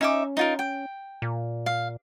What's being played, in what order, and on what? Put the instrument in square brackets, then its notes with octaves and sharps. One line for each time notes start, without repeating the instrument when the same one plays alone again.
[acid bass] C#4 [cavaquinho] D#4 E5 D6
[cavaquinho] D#4 F4 A#4
G5
[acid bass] A#2
[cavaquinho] F5